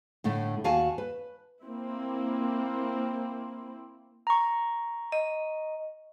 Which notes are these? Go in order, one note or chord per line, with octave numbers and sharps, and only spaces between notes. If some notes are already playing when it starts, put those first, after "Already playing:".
A2 D3 A3
D#2 F#4 F5 G#5 A5
B4
A#3 C4 E4
A#5 C#6
D#5